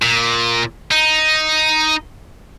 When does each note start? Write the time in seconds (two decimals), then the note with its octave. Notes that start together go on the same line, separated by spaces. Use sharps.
0.02 A#2
0.91 D#4